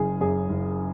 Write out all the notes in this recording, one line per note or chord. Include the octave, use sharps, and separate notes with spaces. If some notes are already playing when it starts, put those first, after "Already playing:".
Already playing: F#1 C#3 G#4
F#2 G#4
F#1